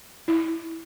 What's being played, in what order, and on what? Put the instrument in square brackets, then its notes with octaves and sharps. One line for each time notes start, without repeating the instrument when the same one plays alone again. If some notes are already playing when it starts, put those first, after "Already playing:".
[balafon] E4